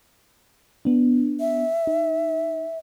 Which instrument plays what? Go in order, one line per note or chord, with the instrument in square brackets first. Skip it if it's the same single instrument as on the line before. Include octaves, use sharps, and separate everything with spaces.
[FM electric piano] B3 D4
[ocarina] E5
[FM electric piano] D#4